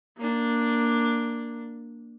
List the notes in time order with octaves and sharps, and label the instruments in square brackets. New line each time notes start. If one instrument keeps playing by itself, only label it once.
[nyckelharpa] A#3 D4